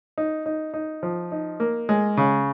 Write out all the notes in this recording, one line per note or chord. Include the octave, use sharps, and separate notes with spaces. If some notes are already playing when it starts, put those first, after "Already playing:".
D#4
D#4
D#4
F3
D#4
A#3
G#3
C#3